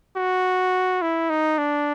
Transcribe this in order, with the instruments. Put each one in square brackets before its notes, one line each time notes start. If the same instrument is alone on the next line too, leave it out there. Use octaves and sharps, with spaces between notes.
[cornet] F#4
E4
D#4
D4